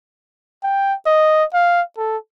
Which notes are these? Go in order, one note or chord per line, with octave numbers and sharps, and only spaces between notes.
G5
D#5
F5
A4